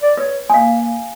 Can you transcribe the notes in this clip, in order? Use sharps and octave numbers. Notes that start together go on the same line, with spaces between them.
D5
B4 C#5
A#3 F5 G#5